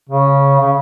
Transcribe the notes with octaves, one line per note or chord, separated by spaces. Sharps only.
C#3
C#3